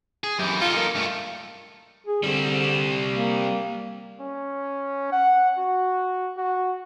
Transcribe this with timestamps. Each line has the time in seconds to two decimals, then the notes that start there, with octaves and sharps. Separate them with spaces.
0.24 G#4
0.39 F#2 E3 G4
0.61 D#4 F4 A4
0.76 A#3
0.95 G2 A3
2.07 G#4
2.23 D3 G3 C4
3.12 A#3
4.20 C#4
5.12 F#5
5.58 F#4
6.37 F#4